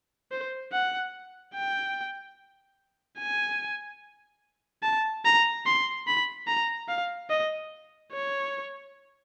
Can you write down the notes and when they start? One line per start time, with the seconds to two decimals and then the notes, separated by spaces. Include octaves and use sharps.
0.31 C5
0.72 F#5
1.54 G5
3.19 G#5
4.83 A5
5.25 A#5
5.66 C6
6.07 B5
6.47 A#5
6.88 F5
7.30 D#5
8.12 C#5